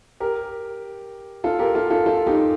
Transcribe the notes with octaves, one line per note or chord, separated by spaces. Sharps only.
G4 A#4
F4 A4
G4 A#4
F4 A4
F4 A4
F4 A4
D#4 G4